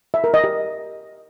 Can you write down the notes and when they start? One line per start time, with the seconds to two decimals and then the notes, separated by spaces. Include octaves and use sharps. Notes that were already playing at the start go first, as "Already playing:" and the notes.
0.14 E5
0.24 A#4
0.34 D#5
0.44 G4